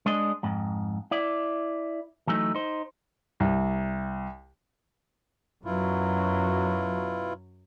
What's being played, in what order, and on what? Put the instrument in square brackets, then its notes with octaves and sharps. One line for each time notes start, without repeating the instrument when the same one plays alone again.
[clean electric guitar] G#3 D4 D#5
F2 G#2
E4 D5
E3 F#3 A3 D#4
D#4 C5
[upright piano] C2
[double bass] F#2 F#3 [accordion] B2 E4 F4